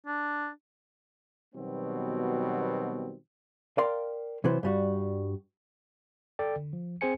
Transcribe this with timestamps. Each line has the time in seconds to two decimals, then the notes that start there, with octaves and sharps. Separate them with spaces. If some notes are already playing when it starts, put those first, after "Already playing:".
0.07 D4
1.55 B2 D#3 F#3 G3 B3 C4
3.78 A#4 D5 F5 G5 C6
4.44 C3 E3 F#3 B3 C5
4.63 G2 G3 F#4
6.39 A4 D5 G5
6.56 D3
6.73 F3
7.01 C4 G#4 C5 G#5 C#7